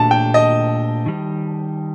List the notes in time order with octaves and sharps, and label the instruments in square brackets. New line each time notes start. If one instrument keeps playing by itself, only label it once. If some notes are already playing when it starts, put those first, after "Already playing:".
Already playing: [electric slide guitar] A#2 A3 D4 G4 [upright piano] A5
[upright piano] G5
D#5
[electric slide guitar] D#3 G3